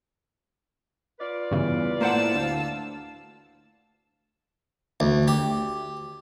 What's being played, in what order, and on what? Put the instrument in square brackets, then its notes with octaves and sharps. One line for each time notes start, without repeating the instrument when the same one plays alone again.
[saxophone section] F4 B4 D5
[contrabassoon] E2 [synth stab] G2 C#3 E3
[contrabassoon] A2 [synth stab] A#3 C5 F#5 [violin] A5 E6
[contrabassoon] D2 [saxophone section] F5
[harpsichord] D2
G4